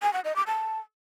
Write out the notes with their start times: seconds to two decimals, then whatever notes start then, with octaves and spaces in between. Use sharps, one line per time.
0.02 G#5
0.13 F#5
0.24 D#5
0.36 D6
0.47 A5